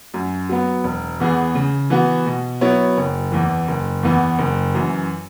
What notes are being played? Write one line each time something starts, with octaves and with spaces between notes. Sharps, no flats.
F#2
F#3 B3
E1
E2 E3 B3 G#4
C#3
E3 B3 F#4
B2
F#3 B3 E4 C#5
F#1
E2 E3
F#1
E2 E3 B3
F#1
F#2 E3